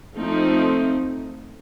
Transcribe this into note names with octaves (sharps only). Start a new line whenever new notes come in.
F3 A3 C4 D#4